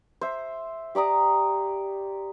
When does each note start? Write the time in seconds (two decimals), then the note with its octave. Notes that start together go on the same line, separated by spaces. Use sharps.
0.21 C5 E5
0.95 G4 D5 A#5 D#6